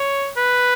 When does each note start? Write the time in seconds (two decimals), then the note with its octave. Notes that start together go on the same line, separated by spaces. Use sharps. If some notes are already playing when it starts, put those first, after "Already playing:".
Already playing: C#5
0.37 B4